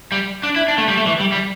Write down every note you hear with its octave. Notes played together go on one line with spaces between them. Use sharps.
G3
D4
E4
D4
A3
G3
A3
E3
G3
G3